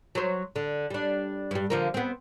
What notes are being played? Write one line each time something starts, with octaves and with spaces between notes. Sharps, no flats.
F#3 C5
D3
G3 D4
G2 G3
D3 F3 A#3
B3 C4